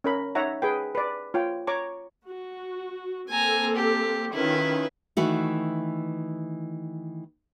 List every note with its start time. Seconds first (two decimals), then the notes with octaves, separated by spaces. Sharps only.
0.04 C#4 A#4 B5
0.35 D#4 C#5 E5 F#5 A#5
0.62 G#4 B4 G5
0.95 B4 D5
1.34 F4 C#5 G5
1.67 C#5 A#5 C#6 D6
2.26 F#4
3.30 A#3 C4 A4 G#5 A#5
3.76 G4
4.33 D#3 C#4 E4 F4 B4
5.17 D#3 E3 A3 F#4